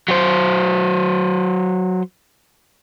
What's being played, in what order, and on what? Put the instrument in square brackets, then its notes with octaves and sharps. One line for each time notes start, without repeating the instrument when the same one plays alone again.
[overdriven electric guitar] F#3 C5